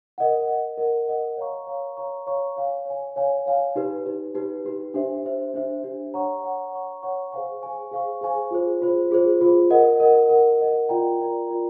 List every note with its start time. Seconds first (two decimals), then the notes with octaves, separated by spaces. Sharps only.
0.18 A#4 D#5 F#5
0.48 A#4 D#5 F#5
0.78 A#4 D#5 F#5
1.08 A#4 D#5 F#5
1.37 C#5 F5 A#5 C#6
1.67 C#5 F5 A#5 C#6
1.97 C#5 F5 A#5 C#6
2.27 C#5 F5 A#5 C#6
2.57 C#5 F5 G#5
2.86 C#5 F5 G#5
3.16 C#5 F5 G#5
3.46 C#5 F5 G#5
3.76 D#4 G4 B4
4.06 D#4 G4 B4
4.35 D#4 G4 B4
4.65 D#4 G4 B4
4.94 D4 G4 C5 E5
5.24 D4 G4 C5 E5
5.54 D4 G4 C5 E5
5.83 D4 G4 C5 E5
6.14 C#5 F#5 A#5 C#6
6.43 C#5 F#5 A#5 C#6
6.73 C#5 F#5 A#5 C#6
7.03 C#5 F#5 A#5 C#6
7.33 G#4 C5 F5 G#5 C#6
7.62 G#4 C5 F5 G#5 C#6
7.92 G#4 C5 F5 G#5 C#6
8.21 G#4 C5 F5 G#5 C#6
8.51 F4 G#4 C5
8.82 F4 G#4 C5
9.11 F4 G#4 C5
9.41 F4 G#4 C5
9.70 A#4 D#5 F#5
10.00 A#4 D#5 F#5
10.29 A#4 D#5 F#5
10.60 A#4 D#5 F#5
10.89 F4 A#4 D5 G5 A#5
11.20 F4 A#4 D5 G5 A#5
11.49 F4 A#4 D5 G5 A#5